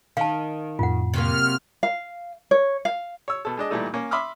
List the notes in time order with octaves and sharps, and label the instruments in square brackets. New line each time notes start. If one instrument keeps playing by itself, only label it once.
[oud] D#3 [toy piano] F5 A5
[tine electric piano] F2 A2 [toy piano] F4 F#5
[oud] C3 F#3 A#3 [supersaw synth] F6
[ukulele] F5
C#5
F5
[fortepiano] C#5 E6
B2 A4
G#3 D4 D#5
A#2 E3 G3 A3 D#4 A4
A#3 C#4
E5 B5 C6 D6 D#6 F6